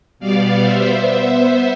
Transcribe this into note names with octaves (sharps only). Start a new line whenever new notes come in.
B2 G3 B3 D5 F5
B3 C5 E5